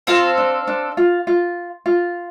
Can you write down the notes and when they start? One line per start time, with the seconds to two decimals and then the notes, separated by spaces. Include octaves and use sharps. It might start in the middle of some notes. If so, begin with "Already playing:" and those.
0.07 C4 F4 A4 F5
0.38 D4
0.67 D4
0.97 F4
1.27 F4
1.86 F4